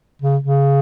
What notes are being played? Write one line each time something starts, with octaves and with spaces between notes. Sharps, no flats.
C#3
C#3